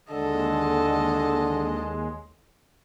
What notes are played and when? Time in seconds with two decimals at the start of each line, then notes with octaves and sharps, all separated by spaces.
0.12 D#2 D3 G#3 A4 D#5